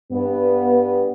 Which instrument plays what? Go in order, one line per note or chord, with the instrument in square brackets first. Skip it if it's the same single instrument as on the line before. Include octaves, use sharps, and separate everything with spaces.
[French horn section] G2 B3